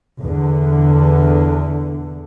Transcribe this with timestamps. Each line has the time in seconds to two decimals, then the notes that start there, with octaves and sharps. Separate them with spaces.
0.22 E2 D3